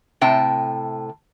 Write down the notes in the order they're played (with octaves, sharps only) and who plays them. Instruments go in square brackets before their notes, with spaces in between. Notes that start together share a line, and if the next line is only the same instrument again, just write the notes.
[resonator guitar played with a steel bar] A2 C3 G5 A5